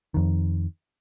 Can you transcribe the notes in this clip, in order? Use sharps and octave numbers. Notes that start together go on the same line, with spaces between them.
F2 D#3